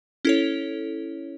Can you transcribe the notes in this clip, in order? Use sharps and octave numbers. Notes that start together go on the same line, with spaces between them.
C#4 E4 A4 C#5